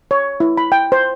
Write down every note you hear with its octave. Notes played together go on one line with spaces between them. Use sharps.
C#5
E4
B5
G5
C5